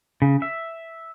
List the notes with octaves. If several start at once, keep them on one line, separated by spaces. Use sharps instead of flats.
C#3
E5